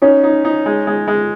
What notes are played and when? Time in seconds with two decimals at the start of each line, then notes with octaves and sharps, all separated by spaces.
0.02 C#4 D#4
0.23 D#4
0.45 D#4
0.66 G#3
0.87 G#3
1.07 G#3